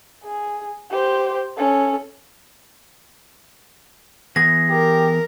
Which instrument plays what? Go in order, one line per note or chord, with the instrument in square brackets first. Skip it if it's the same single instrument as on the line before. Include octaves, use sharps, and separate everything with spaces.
[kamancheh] G#4
G4 C5
C#4 A4
[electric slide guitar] E3 B3 G#4 [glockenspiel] A#6
[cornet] G4 [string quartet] A#4